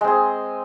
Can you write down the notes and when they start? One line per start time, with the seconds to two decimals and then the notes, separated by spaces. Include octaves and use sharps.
0.01 G#3
0.04 C4
0.08 G#4